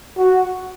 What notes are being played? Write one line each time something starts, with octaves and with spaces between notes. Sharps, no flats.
F#4